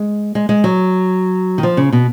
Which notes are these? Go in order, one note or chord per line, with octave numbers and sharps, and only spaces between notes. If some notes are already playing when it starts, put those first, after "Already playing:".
Already playing: G#3
G#3
G#3
F#3
D#3
F3
C#3
B2